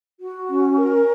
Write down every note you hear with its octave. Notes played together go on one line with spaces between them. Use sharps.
F#4
C#4
A#4